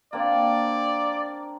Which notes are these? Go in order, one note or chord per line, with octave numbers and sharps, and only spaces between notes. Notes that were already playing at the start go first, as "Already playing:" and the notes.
A#3 C4 D4 D5